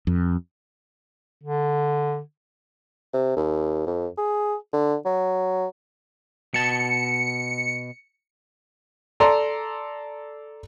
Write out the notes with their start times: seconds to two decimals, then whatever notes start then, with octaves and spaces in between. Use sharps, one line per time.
0.07 F2
1.44 D3
3.13 C3
3.36 D#2
3.86 F2
4.18 G#4
4.73 D3
5.05 F#3
6.54 B2 A5 C#7
9.20 A4 D5 A#5 C6